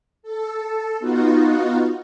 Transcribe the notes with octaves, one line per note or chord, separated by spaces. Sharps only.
A4
B3 D#4 F4 F#4